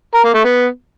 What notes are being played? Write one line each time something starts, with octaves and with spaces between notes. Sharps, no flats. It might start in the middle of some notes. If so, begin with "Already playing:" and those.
A#4
A#3
A3
B3